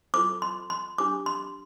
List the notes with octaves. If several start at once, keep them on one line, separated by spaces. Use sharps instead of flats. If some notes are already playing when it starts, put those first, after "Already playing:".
F4 A4 C5 D6
C6
C6
D4 G4 C5 D6
C6